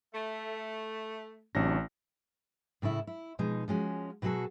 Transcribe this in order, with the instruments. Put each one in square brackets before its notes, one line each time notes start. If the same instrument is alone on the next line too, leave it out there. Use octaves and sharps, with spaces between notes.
[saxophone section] A3
[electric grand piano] A1 A#6 [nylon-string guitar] C3 F#3 D4
[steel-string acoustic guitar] A2 C#3 A3 E4
E4
B2 F3 G#3 D#4
F3 G#3 C#4 F#4
B2 F#3 F#4 G#4 A4